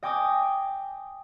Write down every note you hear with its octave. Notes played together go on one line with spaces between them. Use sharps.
D#5 G5 G#5 D6 D#6